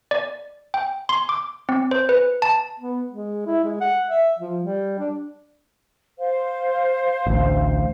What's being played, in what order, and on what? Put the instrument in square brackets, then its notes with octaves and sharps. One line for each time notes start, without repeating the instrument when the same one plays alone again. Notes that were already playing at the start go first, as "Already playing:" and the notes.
[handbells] D5
G5
C6
D6
C4
C5
B4
A5
[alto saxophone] B3
G#3
E4
G#3
F#5
E5
F3
G3
D4
[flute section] C5 F5
[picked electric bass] A1 D2